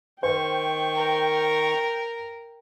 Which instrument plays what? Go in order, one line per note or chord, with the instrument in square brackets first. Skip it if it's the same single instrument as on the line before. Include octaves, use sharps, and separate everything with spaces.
[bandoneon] D#3 C#6 [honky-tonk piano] C5 [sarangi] G5
[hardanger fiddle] A#4